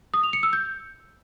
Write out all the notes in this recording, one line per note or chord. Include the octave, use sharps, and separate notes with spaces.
D#6
F7
C#7
E6
G6